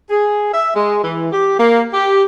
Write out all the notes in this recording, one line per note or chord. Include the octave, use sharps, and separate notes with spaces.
G#4
E5
G#3
E3
G4
A#3
G4